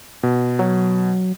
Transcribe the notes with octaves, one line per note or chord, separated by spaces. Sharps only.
B2
F#3